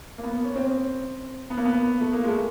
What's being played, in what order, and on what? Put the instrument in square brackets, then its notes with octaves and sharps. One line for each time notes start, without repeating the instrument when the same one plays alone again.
[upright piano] A#3
B3
C#4
C4
B3
A#3
B3
A3
A#3
G#3
A3